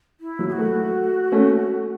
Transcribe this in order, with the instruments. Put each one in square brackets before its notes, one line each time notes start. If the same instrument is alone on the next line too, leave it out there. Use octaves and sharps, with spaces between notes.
[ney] E4
[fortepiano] F#3
[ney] G#4
F#4
[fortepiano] A3
A3 C#4